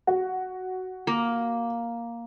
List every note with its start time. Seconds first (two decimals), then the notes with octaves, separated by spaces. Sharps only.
0.07 F#4
1.07 A#3